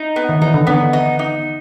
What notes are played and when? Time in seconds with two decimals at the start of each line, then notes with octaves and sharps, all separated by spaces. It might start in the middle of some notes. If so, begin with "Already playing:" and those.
Already playing: D#4
0.16 B3
0.29 D#3
0.41 E3 D#4
0.54 D3
0.67 D3 B3
0.93 D#4
1.19 D#4